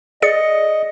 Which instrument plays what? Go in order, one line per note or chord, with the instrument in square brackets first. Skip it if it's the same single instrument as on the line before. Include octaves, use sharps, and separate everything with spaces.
[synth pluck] G#4 D5 C#7 [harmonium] D#5